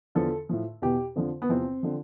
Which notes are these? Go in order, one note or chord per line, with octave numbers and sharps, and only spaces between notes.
E2 D3 F3 A4
A2 F3
E2 B2 G4
F2 D3 F3
B3
E2 C3 F3 C4
D3 F3